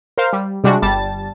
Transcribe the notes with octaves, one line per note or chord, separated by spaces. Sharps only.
A#4 C5 F5
G3
C3 G3 G#3 D4 F#4
G1 G3 A5 A6